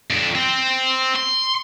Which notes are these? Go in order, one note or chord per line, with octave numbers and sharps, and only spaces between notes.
F2 D4
C4
C6